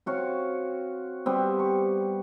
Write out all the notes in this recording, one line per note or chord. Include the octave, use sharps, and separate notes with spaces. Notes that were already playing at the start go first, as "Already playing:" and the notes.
C4 F#4 C#5 F5
G3 B3 C4
C#6